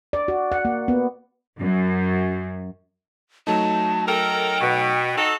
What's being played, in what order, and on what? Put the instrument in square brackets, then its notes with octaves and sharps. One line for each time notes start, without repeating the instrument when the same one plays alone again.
[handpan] D5
F#4
F#5
A#3
B3
[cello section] F#2
[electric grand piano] F#3 A3 D#4 [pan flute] A5
[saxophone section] A4 A#4 [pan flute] G5
[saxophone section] B2
D#4 F#4 A4